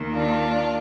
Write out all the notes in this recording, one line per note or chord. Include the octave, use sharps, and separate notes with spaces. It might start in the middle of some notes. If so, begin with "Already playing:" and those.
Already playing: D#2 D#3
D4 F4